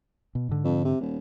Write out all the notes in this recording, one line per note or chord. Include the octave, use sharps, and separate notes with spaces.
B2
G#2 D3
F2
C3
D#1